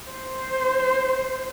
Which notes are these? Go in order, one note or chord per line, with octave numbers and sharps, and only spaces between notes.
C5